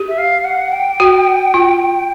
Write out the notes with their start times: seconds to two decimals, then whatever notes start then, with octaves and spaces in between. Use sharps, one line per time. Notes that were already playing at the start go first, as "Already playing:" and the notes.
Already playing: G4
0.08 E5
0.18 F5
0.45 F#5
0.72 G5
1.00 F#4
1.54 F4